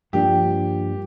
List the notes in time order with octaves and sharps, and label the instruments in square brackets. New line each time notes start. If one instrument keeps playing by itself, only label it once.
[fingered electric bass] G2 F3 A#3 D4 [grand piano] G4